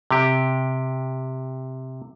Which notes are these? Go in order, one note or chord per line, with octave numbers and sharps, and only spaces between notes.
C3 G4